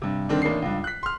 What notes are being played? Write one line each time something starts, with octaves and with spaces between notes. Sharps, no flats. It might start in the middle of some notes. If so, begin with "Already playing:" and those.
G2 C3
G2 D3 D#3 C4 D4
A1 A#3 D4 D#4 C7
C#2 G2
F#6 B6
C6 F6